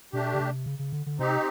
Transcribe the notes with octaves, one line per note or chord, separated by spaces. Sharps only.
B2 A3 D4 G4
C#3
C3
C#3
C#3
D3
D3
C3 C4 D#4 G4